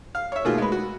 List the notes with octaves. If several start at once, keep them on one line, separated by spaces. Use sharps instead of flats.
F5
C#5 E5
B2 D#3 A3 A#3 F4 G#4
G#3 B4
F#4